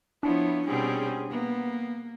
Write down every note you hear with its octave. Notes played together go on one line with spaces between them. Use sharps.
F3 B3 D4 E4 C#5
B2 G3 C4 C#4 G#4
A#3 B3